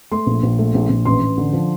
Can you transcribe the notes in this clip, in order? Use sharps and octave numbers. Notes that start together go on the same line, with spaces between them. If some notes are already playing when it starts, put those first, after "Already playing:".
A3 C6
A#1
A#1
A3
A#1
A#1
A1 C6
A1
D3
F3